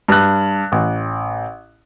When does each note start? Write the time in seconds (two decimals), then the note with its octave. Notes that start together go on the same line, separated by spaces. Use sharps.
0.08 G2 F#6
0.72 A1